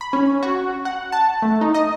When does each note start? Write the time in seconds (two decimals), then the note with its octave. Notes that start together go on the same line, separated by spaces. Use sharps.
0.01 B5
0.13 C#4
0.43 F#4
0.85 F#5
1.12 A5
1.42 A3
1.61 D#4
1.74 D#5